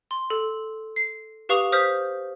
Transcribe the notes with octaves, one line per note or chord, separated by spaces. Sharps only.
C6
A4
C7
G4 B4 F5 C#6 D#6 F7
C5 D#6 F6 G6 B6